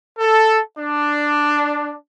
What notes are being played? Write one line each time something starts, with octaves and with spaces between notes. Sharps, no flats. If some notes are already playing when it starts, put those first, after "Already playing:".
A4
D4